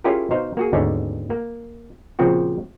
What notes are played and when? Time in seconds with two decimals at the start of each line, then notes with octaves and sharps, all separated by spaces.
0.04 C#4 E4 F4 G4 G#4 A#4
0.31 B2 D#4 C5 F5
0.57 A#3 F#4 G#4
0.73 D#2 G#2 B2 D3 C#4
1.30 A#3
2.19 A#2 C#3 F3 C4 F#4